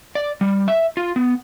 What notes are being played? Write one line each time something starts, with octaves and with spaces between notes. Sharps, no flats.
D5
G3
E5
F4
B3